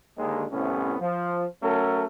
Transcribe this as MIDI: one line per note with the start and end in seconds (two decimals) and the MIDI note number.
0.18 0.45 39
0.18 0.45 50
0.18 0.45 56
0.52 0.95 36
0.52 0.95 45
0.52 0.95 48
0.52 0.95 59
0.52 0.95 61
1.00 1.45 53
1.62 2.04 54
1.62 2.04 57
1.62 2.04 61
1.62 2.04 66
1.62 2.04 69
1.62 2.04 70